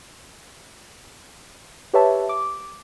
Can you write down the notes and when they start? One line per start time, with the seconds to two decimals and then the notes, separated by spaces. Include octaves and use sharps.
1.93 G4 B4 C#5 E5 A5
2.29 D6